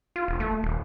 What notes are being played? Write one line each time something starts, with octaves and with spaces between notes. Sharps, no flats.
F4
E1
A3
D#1